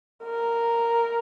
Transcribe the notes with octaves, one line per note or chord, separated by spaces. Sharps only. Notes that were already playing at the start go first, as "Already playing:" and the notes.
A#4